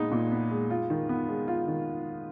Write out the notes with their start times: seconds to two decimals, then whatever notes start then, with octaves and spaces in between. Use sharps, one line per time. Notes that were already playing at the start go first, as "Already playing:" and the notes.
Already playing: A#2 G#3 B3 D#4
0.12 A#2
0.31 B3
0.51 G#3
0.70 F4
0.90 D#3
1.09 B3
1.28 G#3
1.48 F4
1.67 D#3